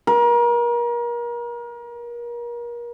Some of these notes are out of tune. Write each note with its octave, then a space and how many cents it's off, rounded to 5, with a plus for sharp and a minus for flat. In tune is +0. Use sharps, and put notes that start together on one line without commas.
A#4 +35